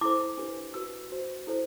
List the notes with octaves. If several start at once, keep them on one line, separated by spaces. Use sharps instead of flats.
E4 A4 C5 D6
D4 G4 B4
F#4 B4 E6
F#4 C5
E4 A4 C5